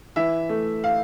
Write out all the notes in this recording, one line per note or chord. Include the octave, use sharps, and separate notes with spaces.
E3 E5
A3
F5